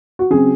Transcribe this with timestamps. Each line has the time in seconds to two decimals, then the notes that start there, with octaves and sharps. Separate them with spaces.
0.19 F#4
0.30 C#3 F#3 C4 G#4